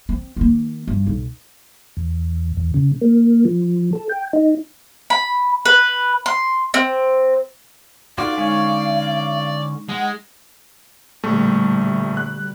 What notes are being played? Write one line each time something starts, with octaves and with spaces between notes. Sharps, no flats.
C4
D#3 A#3
G2
B1
E2
E2
C#3
A#3
F3
A4
G5
D#4
B5
B4
C6
C4
D4 D#4 F4 F#4 A4 D5 F5
D3 G#3 C#4 D#4 C#5
G#3 F#5
A#1 B2 D3 G3 A3
F#6